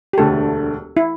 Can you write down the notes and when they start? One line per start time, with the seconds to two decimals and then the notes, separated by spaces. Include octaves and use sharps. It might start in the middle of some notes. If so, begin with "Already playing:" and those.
0.13 G4
0.18 E1 D2 D3 A3 A4
0.97 E4